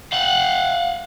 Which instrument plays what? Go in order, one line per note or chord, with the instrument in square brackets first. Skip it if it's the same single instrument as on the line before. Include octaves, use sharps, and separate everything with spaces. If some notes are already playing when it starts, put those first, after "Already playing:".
[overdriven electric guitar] F5 F#5